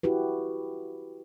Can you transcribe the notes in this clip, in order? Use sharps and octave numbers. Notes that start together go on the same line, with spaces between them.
E4 F#4 G4 B4